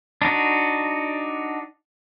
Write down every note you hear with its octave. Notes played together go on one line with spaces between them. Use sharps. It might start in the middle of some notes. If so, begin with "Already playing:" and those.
D4 D#4 F#4